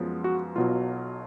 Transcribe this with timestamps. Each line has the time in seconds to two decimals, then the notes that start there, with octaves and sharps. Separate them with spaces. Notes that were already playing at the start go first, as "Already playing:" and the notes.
Already playing: F#2 F3 G#3 B3
0.24 F#4
0.56 B1 B2 F#3 F4